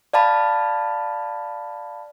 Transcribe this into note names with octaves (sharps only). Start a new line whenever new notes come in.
D5 F5 A5 B5